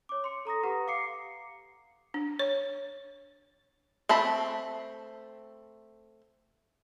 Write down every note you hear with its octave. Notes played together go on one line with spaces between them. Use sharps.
C#5 D6
C6 C#7
A4 A#5 D#6 A#6
G4 B4 F#5 A#5
F5 D6 C7 C#7
D4
C#5
A3 C4 A5 B5